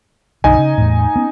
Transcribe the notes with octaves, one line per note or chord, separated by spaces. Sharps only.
B1 F#2 D3 D#4 D#5 G#5
C#3
E2 A2
B3 C#4